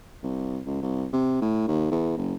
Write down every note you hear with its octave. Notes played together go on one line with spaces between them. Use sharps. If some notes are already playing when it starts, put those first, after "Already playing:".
C2
C#2
C2
C3
A2
D#2
E2
F#1